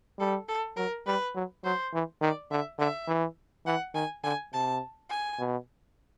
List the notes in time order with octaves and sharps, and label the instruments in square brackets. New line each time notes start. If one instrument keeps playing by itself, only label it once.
[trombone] G3 [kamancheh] A4
[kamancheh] A4
[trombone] F#3 [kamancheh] A#4
[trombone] G3 [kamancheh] B4
[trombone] F#3
[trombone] F#3 [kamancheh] C5
[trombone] E3
[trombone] D#3 [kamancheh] D5
[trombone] D3 [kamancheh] E5
[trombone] D3 [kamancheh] E5
[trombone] E3
[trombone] E3 [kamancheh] F#5
[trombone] D#3 [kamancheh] G#5
[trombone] D3 [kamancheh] G#5
[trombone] C3 [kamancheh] A5
[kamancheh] G#5
[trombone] B2